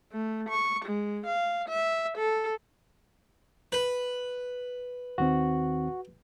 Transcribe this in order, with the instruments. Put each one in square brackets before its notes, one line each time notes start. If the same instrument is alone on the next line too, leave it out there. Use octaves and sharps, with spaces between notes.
[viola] A3
C#6
G#3
F5
E5
A4
[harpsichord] B4
[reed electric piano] D#2 D#3 C4 [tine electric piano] F#4